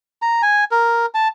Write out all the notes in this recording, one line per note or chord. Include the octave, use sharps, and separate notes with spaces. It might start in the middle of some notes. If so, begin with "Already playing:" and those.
A#5
G#5
A#4
A5